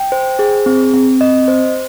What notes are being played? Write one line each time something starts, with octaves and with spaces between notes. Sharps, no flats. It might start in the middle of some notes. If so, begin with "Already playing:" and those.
Already playing: G5
C5
G#4
C4
C4
D#5
C5